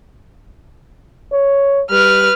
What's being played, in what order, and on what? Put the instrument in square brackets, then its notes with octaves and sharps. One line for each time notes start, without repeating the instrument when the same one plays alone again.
[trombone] C#5
[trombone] G3 [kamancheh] B4 F6